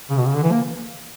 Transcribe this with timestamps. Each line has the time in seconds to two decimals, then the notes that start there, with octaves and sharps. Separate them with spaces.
0.10 C#3
0.18 B2
0.26 C#3
0.35 D3
0.43 E3
0.51 A#3